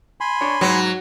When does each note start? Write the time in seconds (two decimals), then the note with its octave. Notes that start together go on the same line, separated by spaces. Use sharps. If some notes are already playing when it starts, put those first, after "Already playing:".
0.21 G#5 B5 C6
0.41 D4 C#5
0.61 G#2 F#3